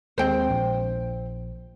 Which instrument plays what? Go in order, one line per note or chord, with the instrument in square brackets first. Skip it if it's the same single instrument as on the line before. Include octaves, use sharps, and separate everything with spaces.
[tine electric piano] D#2 G#3 C4 [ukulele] C5 G5
[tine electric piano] A#1